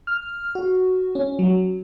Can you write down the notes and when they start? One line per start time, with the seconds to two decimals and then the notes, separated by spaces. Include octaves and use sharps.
0.07 F6
0.55 F#4
1.15 C#4
1.39 F#3